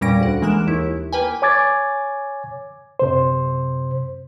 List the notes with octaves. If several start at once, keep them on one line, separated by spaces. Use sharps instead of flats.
E2 A#2 G3 C#4 A#6 D7
D2 F#5
E3 G#3 A#3 F#6 D7 E7
D#2 E4
A#3 B4 G5 G#5
C#5 G#5 D6 G#6 A6
F#2 C3 C5